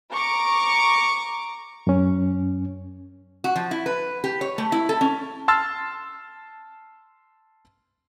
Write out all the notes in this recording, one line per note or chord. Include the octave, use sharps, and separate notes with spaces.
A#5 C#6 D6
F#2 C#4
F#4
F3
E4
B4
G4
C#5
A3
E4
A4
C#4
A5 C6 E6 F6 A6